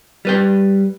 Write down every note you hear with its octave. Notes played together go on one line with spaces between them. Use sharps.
G3 B4 G5